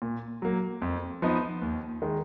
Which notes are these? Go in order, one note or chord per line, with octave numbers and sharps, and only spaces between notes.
A#2
F#3 A#3
F2
F3 B3 D#4
D#2
D#3 G#3